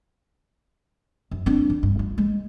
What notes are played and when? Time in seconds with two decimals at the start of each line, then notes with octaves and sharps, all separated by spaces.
1.31 F#2
1.46 C4 D4
1.70 D#3
1.83 G2
1.99 F4
2.18 G#3